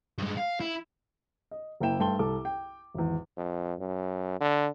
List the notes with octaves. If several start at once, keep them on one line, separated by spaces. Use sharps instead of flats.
G2 G#3
F5
E4
D#5
F#1 A#3 E4 G5 E7
G2 A3 G5 A5 C6 G7
C2 A4 D6
G5
G#1 E2
F2
F#2
D3